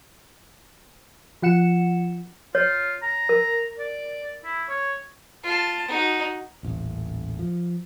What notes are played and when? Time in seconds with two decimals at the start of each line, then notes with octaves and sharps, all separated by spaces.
1.42 F3 F4 F#5 C#7 E7
2.55 F4 C#5
3.03 A#5
3.29 A#4
3.79 D5
4.44 E4
4.69 C#5
5.44 F4 A5
5.88 D#4 F#4
6.63 D#1 A1
7.39 F3